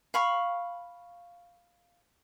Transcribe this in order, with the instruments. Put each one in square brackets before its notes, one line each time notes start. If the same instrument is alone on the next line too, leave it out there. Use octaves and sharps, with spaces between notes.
[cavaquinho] F5 B5 C#6